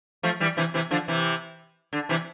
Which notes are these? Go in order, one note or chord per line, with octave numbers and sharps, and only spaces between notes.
F3 A3
E3 G3
C3 E3
C3 E3
D3 F3
C3 E3
D3
C3 E3